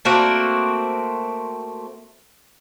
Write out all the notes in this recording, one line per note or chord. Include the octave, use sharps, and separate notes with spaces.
A3 A#3 C4 F#4